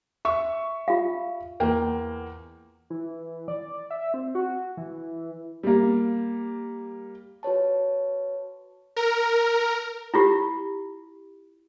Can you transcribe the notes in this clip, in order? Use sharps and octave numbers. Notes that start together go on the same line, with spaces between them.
E5 C#6
F4 F5
E2 A#3 G5
E3
D5
E5
C4
F#4
E3
G3 A#3
F#4 B4 C#5 A5
A#4
E4 F4 G4